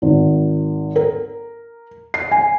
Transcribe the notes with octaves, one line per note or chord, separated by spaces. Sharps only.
G#1
A#4
C7
G#5